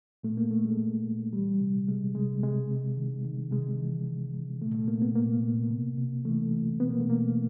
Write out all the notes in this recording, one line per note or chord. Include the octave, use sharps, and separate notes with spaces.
A#2 A3
A#3
A#2 A3
G#3
A#2
A#2
E3 G3
C3
C3 G#3
C3 G#3
C3 G#3
C3
D#3
D#3
C3 G#3
E3
C3
C3
A#2 A3
A3
A#2 A#3
B3
A#2 A#3
A#2
C3
C3
E3 A3
E3
B2 B3
A#3
A3
B2 A#3
B2